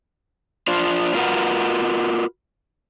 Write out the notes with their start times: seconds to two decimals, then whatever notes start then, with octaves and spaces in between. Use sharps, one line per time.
0.68 D4 F4 C5
1.15 F4 F#4 A#4 B4 E5 F#5